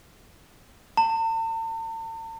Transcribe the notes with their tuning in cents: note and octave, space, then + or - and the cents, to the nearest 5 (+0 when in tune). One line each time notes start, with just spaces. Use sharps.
A5 +45